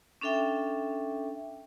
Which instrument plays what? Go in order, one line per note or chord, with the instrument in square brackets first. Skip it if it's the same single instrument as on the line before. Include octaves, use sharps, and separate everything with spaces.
[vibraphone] C#4 D4 A4 E5 G5